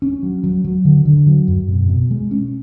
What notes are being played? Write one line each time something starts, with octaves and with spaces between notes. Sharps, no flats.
C#4
F#3
F#3
F#3
D3
D3
F#3
F#2
B2
B2
G#3
C#4